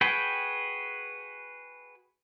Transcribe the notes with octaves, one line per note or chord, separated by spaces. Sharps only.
F#4 G#4 B4 G5